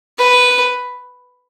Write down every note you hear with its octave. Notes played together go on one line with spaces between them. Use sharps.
B4